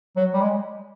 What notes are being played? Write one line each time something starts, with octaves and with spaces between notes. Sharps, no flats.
F#3
G3
G#3